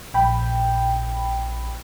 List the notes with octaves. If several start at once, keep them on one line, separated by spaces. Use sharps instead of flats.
A#1 G5 B5